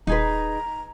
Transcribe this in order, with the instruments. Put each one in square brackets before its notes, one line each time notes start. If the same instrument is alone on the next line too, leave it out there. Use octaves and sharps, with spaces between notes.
[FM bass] D#1 [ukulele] D#4 G#4 B4 [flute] A#5